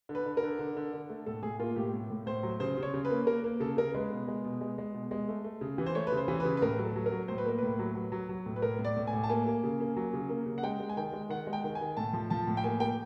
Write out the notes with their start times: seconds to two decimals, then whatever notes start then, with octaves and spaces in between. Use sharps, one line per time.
0.09 D3
0.15 B4
0.26 D3
0.37 A#4
0.43 D3
0.59 D3
0.77 D3
0.93 D3
1.10 A3
1.26 A2 A4
1.43 A2 G#4
1.59 A#3 F4
1.76 A2 G4
1.94 A2
2.10 A2
2.26 A2 C5
2.43 F#3
2.60 C#3 C5
2.78 C#3 C#5
2.94 C#3
3.05 B4
3.10 A#3
3.27 A#3 A#4
3.44 A#3
3.60 C#3 A4
3.77 C#3 A#4
3.94 G#3 B4
4.11 B2
4.28 G#3
4.44 B2
4.61 G#3
4.78 G#3
4.94 B2
5.11 G#3
5.28 A3
5.44 A3
5.61 C#3
5.78 E3
5.86 C5
5.95 A3 C#5
6.07 B4
6.12 C#3
6.17 C5
6.28 E3
6.40 C#3 B4
6.57 B4
6.62 A2 A#4
6.78 F#3
6.85 A4
6.96 F#3
7.06 A#4
7.11 F#3
7.28 A2 C5
7.38 B4
7.46 A#3 A#4
7.58 A2 B4
7.79 F#3
7.95 F#3
8.12 F#3
8.29 F#3
8.46 A2
8.56 B4
8.62 A2 A#4
8.79 A2
8.85 D5
8.97 A2
9.07 G#5
9.13 A2
9.23 A5
9.29 A#3 G#5
9.47 A#3
9.64 C#3
9.80 A#3
9.96 F#3
10.13 C#3
10.29 A#3
10.46 C#3
10.58 F#5
10.63 G#3 G5
10.80 G#3
10.89 G#5
10.97 D#3 G5
11.13 G#3
11.30 D#3 F#5
11.47 G#3
11.53 G5
11.64 D#3
11.75 G#5
11.81 D#3
11.97 A2 A5
12.13 F3
12.30 F3 A5
12.47 A2
12.57 G5
12.64 A#3 G#5
12.80 A#3 G5